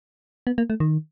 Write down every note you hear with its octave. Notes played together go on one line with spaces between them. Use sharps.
B3
A#3
A3
D#3